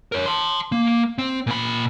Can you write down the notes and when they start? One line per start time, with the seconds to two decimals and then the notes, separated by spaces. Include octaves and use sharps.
0.12 A#4 C#5
0.26 A5 C6
0.72 A#3
1.18 C4
1.47 A#2 B5